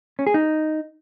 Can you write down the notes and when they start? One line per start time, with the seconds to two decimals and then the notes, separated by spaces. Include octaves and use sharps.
0.19 C#4
0.27 G#4
0.34 D#4